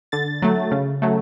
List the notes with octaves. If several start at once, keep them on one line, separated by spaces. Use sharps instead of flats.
D3 A6
F#3 A3
C#3
F#3 A3